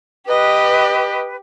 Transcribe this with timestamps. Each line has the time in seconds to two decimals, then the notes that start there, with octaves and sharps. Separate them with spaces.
0.29 G4 B4 D#5